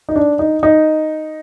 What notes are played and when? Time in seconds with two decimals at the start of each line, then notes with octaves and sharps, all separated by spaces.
0.09 D#4
0.16 D4
0.39 D#4
0.63 D#4